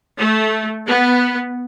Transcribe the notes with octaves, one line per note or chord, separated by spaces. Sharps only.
A3
B3